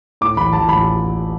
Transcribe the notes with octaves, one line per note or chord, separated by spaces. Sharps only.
A2 D6
A1 B5
A1 A5
A1 B5